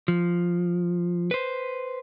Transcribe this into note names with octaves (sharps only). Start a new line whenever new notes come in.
F3
B4 C5